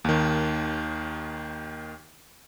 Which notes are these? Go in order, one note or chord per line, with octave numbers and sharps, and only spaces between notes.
D#2 D#3